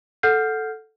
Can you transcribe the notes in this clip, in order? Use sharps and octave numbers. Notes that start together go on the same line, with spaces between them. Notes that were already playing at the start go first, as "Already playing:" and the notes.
A4 F#5 F6 G6 C7